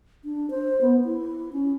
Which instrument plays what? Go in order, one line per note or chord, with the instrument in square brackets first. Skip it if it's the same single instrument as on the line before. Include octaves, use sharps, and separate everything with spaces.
[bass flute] D4
C5
B3
E4
C#4